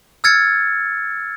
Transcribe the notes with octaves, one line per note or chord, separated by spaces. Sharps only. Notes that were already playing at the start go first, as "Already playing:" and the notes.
E6 F6 G#6 A6 C#7